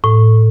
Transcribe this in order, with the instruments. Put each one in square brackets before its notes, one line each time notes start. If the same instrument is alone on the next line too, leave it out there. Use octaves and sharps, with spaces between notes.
[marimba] A2